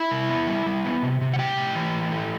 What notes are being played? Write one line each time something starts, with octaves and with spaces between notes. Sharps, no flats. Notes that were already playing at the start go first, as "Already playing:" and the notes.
Already playing: E4 E5
C3
B3
G3
G3
B3
C3
C3
F#5
A2 G4 G5
A2
E3
A2
A3